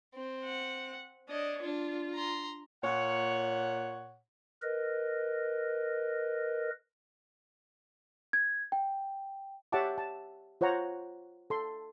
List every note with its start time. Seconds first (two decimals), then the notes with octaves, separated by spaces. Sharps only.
0.15 C4
0.44 F#5
1.29 D4 C#5 D#5
1.62 D4 F4
2.14 A#5 C6
2.83 A#2 C#5 F#5
4.62 A#4 B4 D#5
8.33 G#6
8.72 G5
9.72 G4 C#5 E5 F#5 A5 D6
9.98 A5
10.61 F4 C5 C#5 F#5 A#5
11.50 A4 C6